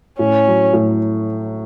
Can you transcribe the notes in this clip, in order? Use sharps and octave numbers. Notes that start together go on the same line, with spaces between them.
A2 C#4
F#3
A2